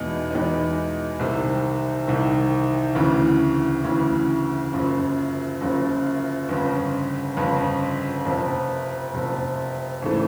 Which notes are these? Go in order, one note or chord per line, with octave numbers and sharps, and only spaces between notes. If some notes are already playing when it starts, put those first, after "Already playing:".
Already playing: E2 B2 G#3 B3 D#4
E2 B2 G#3 B3 D#4
C2 C3 D#3
C2 C3 D#3
D2 C#3 E3
D2 C#3 E3
F#1 F#2 C#3 F3
F#1 F#2 C#3 F3
G1 F2 C#3
G1 F2 C#3
F#1 F2 C3
F#1 F2 C3
G#1 C#3 E3 A3